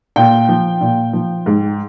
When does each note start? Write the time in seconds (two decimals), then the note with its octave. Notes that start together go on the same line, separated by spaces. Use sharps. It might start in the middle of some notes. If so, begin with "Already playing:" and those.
0.16 A#2 G5
0.49 F3
0.81 A#2
1.13 F3
1.46 G#2